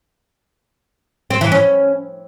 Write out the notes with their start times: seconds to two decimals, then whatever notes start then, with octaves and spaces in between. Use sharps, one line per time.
1.30 C4
1.41 E3
1.52 C#4